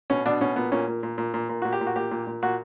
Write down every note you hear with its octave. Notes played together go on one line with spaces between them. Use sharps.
B2 C#4
B2 D4
B2 C#4
A#2 B3
A#2 C#4
A#2
A#2
A#2
A#2
A#2
A#2 F#4
G4
A#2
F#4
A#2 G4
A#2
A#2
A#2 F#4